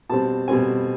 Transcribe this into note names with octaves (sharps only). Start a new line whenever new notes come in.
B2 G3 C4 A5
B2 G3 C4 G#5